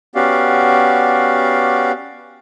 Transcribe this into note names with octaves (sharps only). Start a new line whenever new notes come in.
B3 C#4 F#4 G4 D5 F5